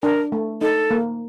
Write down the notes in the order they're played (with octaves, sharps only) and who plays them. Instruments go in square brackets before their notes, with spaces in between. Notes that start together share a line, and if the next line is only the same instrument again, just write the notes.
[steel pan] D4 [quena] A#4
[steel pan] A3
[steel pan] D#4 [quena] A4
[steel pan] A#3